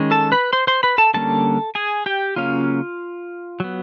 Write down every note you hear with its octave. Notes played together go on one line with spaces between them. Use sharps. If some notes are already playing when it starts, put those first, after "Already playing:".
Already playing: D#3 G#3 C#4
A4 A5
B4 B5
C5 C6
C5 C6
B4 B5
A4 A5
D3 G3 A#3 C#4 A4 A5
G#4 G#5
G4 G5
C#3 F#3 A#3 C#4 F4 F5
F#3 B3